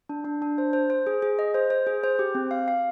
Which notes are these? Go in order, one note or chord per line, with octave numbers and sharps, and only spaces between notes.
D4
D4
D4
C5
C5
C5
G#4
G#4
D#5
C5
C5
G#4
C5
G4
C4
F5
F5